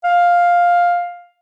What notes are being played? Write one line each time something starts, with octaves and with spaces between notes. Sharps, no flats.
F5